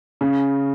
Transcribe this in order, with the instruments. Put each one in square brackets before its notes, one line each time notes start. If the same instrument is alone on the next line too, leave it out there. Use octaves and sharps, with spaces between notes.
[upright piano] C#3